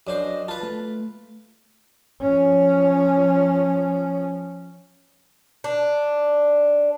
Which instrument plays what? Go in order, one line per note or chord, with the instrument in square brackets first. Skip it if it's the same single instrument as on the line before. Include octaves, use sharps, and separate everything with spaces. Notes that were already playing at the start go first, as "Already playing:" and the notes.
[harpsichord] F#2 D4 C5 [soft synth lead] D#5
[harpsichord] F4 B4 [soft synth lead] A5
[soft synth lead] A3
[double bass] F3 C#4
[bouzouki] D4